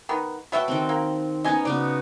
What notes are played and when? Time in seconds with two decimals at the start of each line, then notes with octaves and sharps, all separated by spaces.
0.09 D#3 B3
0.52 B3 F#4 C#5 E5 G5 A5
0.68 D#3 C4
0.89 A#3
1.44 B3 C#4 D#4 D#5 G#5
1.65 C#3 B3 F#4 D5